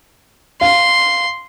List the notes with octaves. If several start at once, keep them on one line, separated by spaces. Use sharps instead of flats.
F5 C6